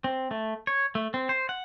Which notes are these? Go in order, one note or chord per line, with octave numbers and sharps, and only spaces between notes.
C4
A3
C#5
A3
C4
C5
F#5